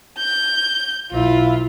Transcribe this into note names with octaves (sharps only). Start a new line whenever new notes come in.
G6
B1 E4 F4